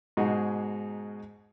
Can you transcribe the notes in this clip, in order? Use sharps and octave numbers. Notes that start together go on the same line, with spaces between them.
G#2 B2 G#3 D#4 F#4 G#4